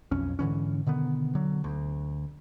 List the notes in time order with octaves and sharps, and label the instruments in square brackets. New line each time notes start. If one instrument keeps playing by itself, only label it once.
[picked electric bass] B1 F2 C#4
G#2 D3 E3 C#4
B2 D3 D#3 B3
D3 F#3
D2